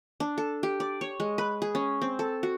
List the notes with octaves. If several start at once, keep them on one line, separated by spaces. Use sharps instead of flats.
D4
A4
G4
D5
C#5
G#3
B4
G#4
C#4
C4
A4
F#4